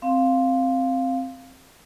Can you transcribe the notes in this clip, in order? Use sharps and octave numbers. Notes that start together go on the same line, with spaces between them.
C4 F5